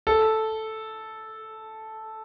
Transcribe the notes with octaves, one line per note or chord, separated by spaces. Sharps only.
A4